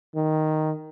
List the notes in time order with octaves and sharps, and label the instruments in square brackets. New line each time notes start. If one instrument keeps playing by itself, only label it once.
[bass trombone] D#3